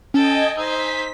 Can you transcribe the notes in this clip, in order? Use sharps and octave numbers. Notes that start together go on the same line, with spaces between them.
C#4 A4 D#5 G5 G#5
D#4 C5 E6 B6